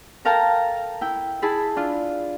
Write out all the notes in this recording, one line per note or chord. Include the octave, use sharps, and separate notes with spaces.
A4 A#4 F5 G5 A5 A#5
E4 G5
E4 G#4 A5 B5
D4 F4